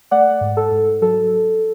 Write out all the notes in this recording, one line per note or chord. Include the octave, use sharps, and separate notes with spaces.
A3 D5 F#5
G#2
A4
G#2
F#3 A4